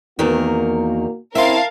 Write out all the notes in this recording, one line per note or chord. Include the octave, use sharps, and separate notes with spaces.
E2 D#3 A#3 F#4 A#4
C4 C#4 E4 A#4 E5 F5 A5 C6